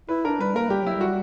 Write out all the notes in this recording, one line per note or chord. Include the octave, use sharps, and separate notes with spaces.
E4 B4
D4 A#4
G3 B4
A#3 A#4
G3 G4
F#3 E4
G3 F#4